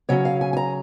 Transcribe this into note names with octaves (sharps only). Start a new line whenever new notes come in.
C#3 F#3 C#4 C#5
F5
G#5
G#5
A#5